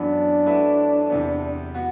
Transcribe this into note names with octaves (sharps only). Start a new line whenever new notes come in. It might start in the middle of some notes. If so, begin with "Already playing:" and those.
Already playing: F#2 E3 B3 D4 F#4
F#3 A3 E4 B4 E5
E2 C3 E3 B3
B3 F#4